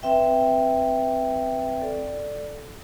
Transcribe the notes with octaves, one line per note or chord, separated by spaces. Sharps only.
C4 B4 E5 G5
A4 D5